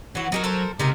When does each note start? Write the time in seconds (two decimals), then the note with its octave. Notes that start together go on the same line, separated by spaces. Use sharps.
0.15 E3 F#3 F#4
0.32 F#3 D#4 G4 A#4
0.44 A4 A#4 C5
0.79 C#2 C3 D#4 A#4